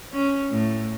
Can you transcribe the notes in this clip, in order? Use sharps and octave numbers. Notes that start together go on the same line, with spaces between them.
C#4
A2